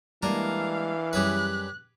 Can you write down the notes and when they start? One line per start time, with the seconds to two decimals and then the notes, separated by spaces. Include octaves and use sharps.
0.23 E3 G3 G#3 A#3 D4 A#4 F5
1.13 F#2 G3 C#4 G4 G#4 B4 F#6